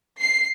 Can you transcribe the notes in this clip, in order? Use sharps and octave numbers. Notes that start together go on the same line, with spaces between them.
C7